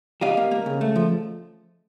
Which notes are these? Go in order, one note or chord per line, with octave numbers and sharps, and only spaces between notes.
G3 D#5 F5
A#3
A#3
C#3
A3
F3